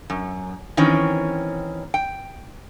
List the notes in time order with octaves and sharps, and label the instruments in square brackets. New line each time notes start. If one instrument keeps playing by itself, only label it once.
[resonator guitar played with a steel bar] F#2
D#3 E3 C4 C#4
G5